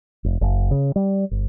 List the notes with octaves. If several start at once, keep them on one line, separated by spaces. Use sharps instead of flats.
F1
F#1
C#3
G3
G1